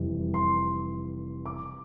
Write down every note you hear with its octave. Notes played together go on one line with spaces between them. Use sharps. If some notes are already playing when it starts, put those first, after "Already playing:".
Already playing: F1 F2 E3 G3
C6
D6